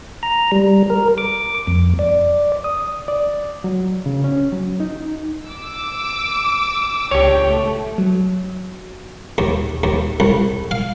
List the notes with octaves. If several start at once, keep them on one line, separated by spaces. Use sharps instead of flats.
A#5
G3
A#4
D6
F2
D5
D#6
D5
F#3
C#3
C#4
F#3
D#4
D6 E6
C#2 D4 G4 C#5 G5
A3
F#3
D#2
D#2
C2
F5